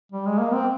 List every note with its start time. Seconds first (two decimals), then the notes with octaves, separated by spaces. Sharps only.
0.12 G3
0.27 G#3
0.40 A#3
0.54 C4